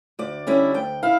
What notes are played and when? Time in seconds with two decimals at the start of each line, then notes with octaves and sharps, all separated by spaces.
0.19 D2 D5
0.47 D3 G3 C#4 E4
0.74 D2 G5
1.03 E4 F5